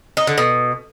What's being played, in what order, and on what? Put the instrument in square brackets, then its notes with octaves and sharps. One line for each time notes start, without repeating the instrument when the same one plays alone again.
[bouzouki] D#4
D3
B2